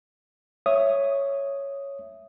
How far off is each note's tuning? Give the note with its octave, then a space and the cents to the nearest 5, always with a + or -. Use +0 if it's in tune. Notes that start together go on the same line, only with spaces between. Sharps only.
C#5 +0 E5 +10 D#6 +0